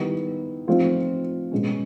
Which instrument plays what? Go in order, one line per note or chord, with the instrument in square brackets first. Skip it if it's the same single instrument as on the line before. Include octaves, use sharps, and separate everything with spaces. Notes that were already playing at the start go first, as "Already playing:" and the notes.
Already playing: [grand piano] D#3 G3 B3 E4
F3 A3 C4 D#4 F4
B2 G#3 C#4